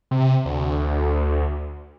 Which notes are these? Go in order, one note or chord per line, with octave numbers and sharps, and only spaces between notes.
C3
D2